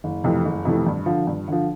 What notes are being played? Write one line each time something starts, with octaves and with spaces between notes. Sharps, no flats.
F#1
F2 C3 E3 A3
F#1
F2 C3 E3 A3
G2
D3 F3
G2
D3 F3